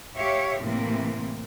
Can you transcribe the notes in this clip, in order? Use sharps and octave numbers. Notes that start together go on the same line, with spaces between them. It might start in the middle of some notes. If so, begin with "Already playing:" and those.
G4 C#5 E5 F5
A2 C3 E3 A#3 C4